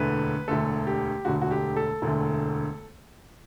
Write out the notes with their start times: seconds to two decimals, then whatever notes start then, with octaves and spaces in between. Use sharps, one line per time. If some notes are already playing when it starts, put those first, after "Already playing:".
Already playing: E1 D2 D3 A3 B4
0.48 E1 D2 D3 A3 A4
0.87 G4
1.25 E1 D2 D3 A3 F#4
1.41 F#4
1.51 G4
1.76 A4
2.02 E1 D2 D3 A3